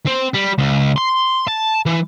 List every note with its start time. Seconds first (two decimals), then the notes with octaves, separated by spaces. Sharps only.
0.07 C4
0.35 G3
0.58 C#2
0.96 C6
1.48 A5
1.86 E3